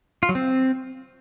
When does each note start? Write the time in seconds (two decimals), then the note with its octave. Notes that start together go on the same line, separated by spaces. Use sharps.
0.23 F4
0.29 F#3
0.35 C4